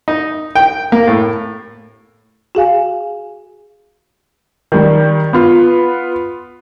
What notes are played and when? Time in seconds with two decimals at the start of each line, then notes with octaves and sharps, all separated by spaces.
0.08 D#4
0.55 G5
0.92 A#3
1.07 A2
2.55 F#4 G#4 F5 G#5
4.72 D#3 G3
5.33 B3 F4